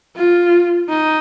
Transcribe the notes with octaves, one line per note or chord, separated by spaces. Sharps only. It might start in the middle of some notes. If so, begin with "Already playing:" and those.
F4
D#4